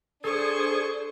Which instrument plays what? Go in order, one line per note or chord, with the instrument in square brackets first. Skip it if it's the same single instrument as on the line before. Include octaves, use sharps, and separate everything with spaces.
[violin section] D4 C5 [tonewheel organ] G#4 [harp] A4 [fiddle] C#6